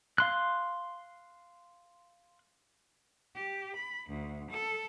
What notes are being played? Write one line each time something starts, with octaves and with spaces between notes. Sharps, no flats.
F5 C6 F#6
G4
B5
D2
A4